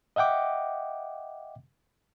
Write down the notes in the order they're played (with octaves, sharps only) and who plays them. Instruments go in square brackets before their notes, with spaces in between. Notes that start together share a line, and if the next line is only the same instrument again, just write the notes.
[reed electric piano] D#5 E5 F#5 G5 D6